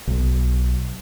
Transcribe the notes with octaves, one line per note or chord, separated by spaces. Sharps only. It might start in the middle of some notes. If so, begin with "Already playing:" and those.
B1